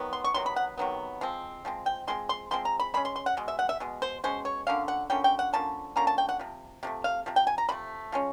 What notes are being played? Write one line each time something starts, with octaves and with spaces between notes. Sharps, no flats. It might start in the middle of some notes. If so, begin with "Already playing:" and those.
Already playing: C3 D#3 F#3 B3
C6
C#6
C3 D#3 F#3 B3 C6
B5
F#5
C3 D#3 F#3 B3
F3 G#3 C4
F3 G#3 C4
G5
F3 G#3 C4 C6
C6
F3 G#3 C4 C6
A#5
B5
B2 G#3 C#4 B5
C6
C6
F#5
B2 G#3
E5
F#5
E5
B2 G#3
C5
B2 G#3 C#4 C5
C#5
D3 F3 A#3 C#4 F5
F#5
D3 F3 A#3 C#4 G5
G5
F#5
D3 F3 A#3 C#4 A5
D3 F3 A#3 C#4 A#5
A5
G5
F#5
C3 F3
C3 F3 A3
F5
C3 F3
G5
G#5
A#5
C3 F3 A3 B5
F3 G#3 C#4